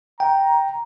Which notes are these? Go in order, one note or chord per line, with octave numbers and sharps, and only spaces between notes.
G5 A#5